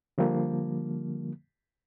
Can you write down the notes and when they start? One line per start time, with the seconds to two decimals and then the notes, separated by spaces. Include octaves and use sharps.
0.18 D3 F3 G3 A#3